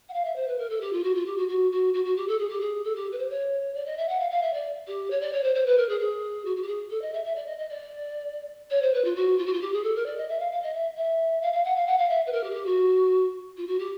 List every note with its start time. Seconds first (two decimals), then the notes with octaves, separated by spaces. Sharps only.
0.08 F#5
0.13 F5
0.24 E5
0.36 C5
0.48 B4
0.58 A#4
0.69 A4
0.80 G4
0.92 F4
1.03 F#4
1.15 F4
1.26 G4
1.37 F#4
1.48 F#4
1.72 F#4
1.94 F#4
2.05 F#4
2.16 G4
2.28 A4
2.39 G#4
2.49 G4
2.60 G#4
2.84 A4
2.95 G4
3.12 B4
3.18 C5
3.29 C#5
3.74 D5
3.86 D#5
3.97 E5
4.09 F#5
4.19 F5
4.30 F5
4.42 E5
4.53 D5
4.87 G4
5.10 C#5
5.21 D5
5.33 C#5
5.43 C5
5.55 C5
5.66 B4
5.77 A#4
5.89 G#4
6.00 G#4
6.45 F#4
6.56 F#4
6.62 G4
6.67 G#4
6.90 A4
7.01 D#5
7.13 E5
7.24 E5
7.35 D5
7.46 D#5
7.58 D#5
7.69 D5
8.70 C#5
8.82 C5
8.94 B4
9.04 F4
9.16 F#4
9.38 F4
9.46 F#4
9.53 F4
9.61 G4
9.73 G#4
9.83 A4
9.95 A#4
10.06 D5
10.17 D#5
10.29 E5
10.39 F5
10.52 F5
10.62 D#5
10.74 E5
10.97 E5
11.41 F5
11.53 F5
11.64 F#5
11.76 F5
11.86 F#5
11.98 F5
12.09 E5
12.26 B4
12.32 A#4
12.43 G4
12.50 G#4
12.54 G4
12.65 F#4
13.57 F4
13.67 F#4
13.79 G4